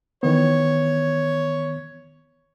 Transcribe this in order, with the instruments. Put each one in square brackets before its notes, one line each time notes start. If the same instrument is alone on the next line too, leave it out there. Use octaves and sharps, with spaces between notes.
[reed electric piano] D#3 E3 B3 [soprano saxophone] C#5